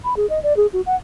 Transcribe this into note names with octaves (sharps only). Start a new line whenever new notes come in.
B5
G#4
D#5
D5
G#4
F#4
F#5